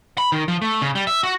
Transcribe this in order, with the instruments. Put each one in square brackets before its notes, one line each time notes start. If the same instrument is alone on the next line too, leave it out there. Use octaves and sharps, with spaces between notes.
[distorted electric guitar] B5
D#3
F3
A3
C#3
G3
E5
F#4